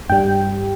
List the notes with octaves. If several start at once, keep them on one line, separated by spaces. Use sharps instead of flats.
G2 G3 G5